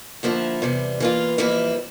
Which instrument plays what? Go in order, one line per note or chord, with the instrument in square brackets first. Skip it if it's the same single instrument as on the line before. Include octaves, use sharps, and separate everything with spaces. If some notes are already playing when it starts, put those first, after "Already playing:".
[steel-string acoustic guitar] D3 F3 A#3 E4
E2 C3 G3
E3 A#3 F4
F2 E3 G3 A#3 E4